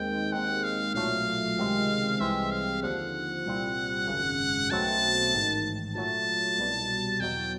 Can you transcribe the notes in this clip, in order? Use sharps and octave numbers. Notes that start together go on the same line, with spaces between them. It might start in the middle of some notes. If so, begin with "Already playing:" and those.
Already playing: D#2 D#3 G#3 C4 G5
D#2 D#3 G#3 C4 F#5
F5
B1 A#2 F#3 A3 F5
C#2 C3 D#3 G#3 C4
C2 C3 E3 G#3 C4 E5
F5
D#2 D3 F3 F#5
C2 A#2 G3 C4
G#1 F#2 C#3
B1 B2 F#3 A3 C4 A5
A1 G#2 D#3
A#2 F#3 A3 A5
C2 B2 G3
E2 B2 F#3 G5